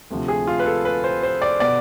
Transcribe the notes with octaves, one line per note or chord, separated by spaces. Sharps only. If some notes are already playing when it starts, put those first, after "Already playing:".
D2 C3 F3
G#4
F4
B4
A4
B4
C5
C5
D5
B2 B3 D5